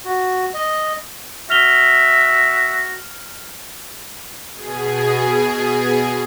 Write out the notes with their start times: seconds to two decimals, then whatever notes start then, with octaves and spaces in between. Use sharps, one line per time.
0.05 F#4
0.54 D#5
1.50 F#4 E5 F6 F7 G7
4.54 B2 G#4